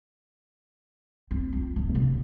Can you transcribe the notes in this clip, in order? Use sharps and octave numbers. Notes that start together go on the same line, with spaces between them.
C4
F4
D1
C3